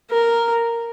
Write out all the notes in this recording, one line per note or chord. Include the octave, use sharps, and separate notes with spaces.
A#4